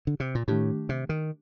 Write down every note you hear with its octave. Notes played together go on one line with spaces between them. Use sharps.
D3
C3
A#2
A2 D#3 A3 D4 G4
C3
D#3